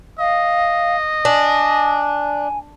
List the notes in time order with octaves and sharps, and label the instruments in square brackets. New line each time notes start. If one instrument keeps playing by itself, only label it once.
[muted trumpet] D#5 [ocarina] F5
[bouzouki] D4 [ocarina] G#5